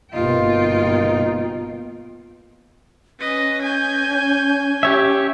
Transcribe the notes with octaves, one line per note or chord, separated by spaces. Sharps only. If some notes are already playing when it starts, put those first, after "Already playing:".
G1 G2 B2 A#3 D#4 F4 G5
C#4 B4 D#5
G#5 G6
G4 C#5 E5